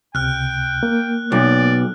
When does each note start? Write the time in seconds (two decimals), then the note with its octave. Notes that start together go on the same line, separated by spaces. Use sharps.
0.15 C#2 C3 G5 F6 F#6
0.83 A#3
1.32 B1 D5